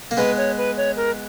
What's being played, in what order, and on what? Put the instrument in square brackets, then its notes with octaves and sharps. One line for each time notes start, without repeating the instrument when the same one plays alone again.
[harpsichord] A#3
[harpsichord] G#3 B3 [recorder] B4
[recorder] C#5
B4
C#5
A#4